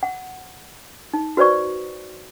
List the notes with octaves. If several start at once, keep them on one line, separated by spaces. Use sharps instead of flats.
F#5
D#4
F#4 B4 C5 D5 C#6